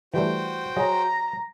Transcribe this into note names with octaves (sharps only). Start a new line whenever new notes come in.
E3 G3 A3 F#4 C5 G5
F#3 G#4 D#5 A#5